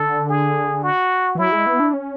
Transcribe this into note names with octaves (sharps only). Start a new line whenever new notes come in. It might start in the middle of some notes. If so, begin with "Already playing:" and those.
Already playing: D3 A4
G#4
F#4
E3
F#3 E4
G#3
B3
D4
C#4